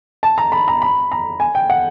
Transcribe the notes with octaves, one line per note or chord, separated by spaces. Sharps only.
A5
A#5
B5
A#5
B5
A#5
G#5
G5
F#5